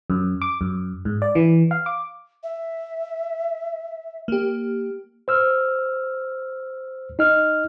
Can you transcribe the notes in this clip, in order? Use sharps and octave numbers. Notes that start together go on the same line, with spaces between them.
F#2
D6
F#2
G#2
D5
E3
F5
D6
E5
A#3 G4
C5 E6 F6
D#4 D#5 F6